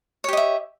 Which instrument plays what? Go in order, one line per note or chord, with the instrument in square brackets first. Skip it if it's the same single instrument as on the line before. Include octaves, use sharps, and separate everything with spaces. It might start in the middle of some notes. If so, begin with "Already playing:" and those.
[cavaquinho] C#5
G4
D#5
E5